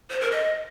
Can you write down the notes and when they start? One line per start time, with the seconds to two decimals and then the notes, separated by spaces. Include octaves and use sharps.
0.10 C5
0.21 A#4
0.31 D#5